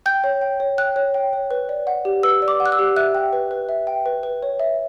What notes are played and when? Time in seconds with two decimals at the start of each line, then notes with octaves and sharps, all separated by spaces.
0.06 G5 G6
0.24 C#5
0.42 G5
0.60 C#5
0.78 G5 F#6
0.96 C#5
1.14 G5
1.33 C#5
1.51 B4
1.69 D5
1.87 F#5
2.05 G4
2.23 B4 E6
2.42 D5
2.48 D6
2.60 F#5
2.66 F#6
2.72 E6
2.79 G4
2.96 E5 F#6
3.15 G5
3.33 B4
3.51 B4
3.69 E5
3.87 G5
4.06 B4
4.23 B4
4.43 C#5
4.60 E5